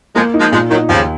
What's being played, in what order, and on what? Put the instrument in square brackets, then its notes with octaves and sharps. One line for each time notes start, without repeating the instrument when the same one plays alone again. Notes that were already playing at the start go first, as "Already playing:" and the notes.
[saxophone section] F3 G#3 [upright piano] A#3
[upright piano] D#4
[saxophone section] F3 G#3
[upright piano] A#2 [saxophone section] F3 G#3
[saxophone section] D#3 F#3 [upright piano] D#4
[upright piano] D#2 [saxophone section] C#3 F3